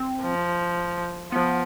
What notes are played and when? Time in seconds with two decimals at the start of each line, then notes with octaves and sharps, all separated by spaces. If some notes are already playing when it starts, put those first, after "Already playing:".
Already playing: C4
0.22 F3
1.32 F3 B3